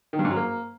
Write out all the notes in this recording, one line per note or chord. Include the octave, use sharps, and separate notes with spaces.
D#3
G2
G#2
F#3
A#3